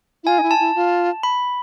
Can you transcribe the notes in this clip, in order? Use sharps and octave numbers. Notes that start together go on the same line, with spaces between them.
E4
F4 G#5
D#4
E4
A5
E4
F4
B5